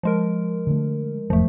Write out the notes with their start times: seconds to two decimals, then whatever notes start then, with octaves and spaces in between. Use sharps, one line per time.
0.03 F3 G#3 A#4
0.67 D3 A3
1.30 F1 E2 G#2 F3 A3